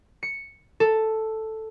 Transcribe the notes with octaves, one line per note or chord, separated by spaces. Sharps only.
C#7
A4